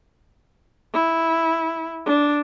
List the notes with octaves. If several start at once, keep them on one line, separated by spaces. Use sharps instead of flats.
E4
D4